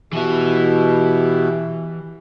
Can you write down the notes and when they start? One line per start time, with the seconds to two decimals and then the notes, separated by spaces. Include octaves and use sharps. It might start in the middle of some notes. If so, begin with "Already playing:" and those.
0.13 B2 E3 E4 G4 E5